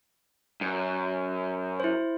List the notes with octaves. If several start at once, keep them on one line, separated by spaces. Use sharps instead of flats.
F#2
E4 C5